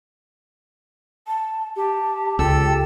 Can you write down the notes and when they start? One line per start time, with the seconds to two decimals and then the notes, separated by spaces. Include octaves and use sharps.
1.27 A5
1.76 G4 A5
2.39 C#2 A4 G5 E6